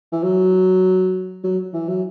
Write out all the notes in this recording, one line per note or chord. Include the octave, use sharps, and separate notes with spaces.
E3
F#3
F#3
E3
F#3